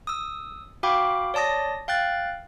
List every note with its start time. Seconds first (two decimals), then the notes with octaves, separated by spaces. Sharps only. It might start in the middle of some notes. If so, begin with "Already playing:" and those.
0.07 D#6 E6
0.83 F#4 F5 G5 B5 D6
1.34 C#5 D5 A5 D#6 A#6
1.88 F5 G5 F#6 A6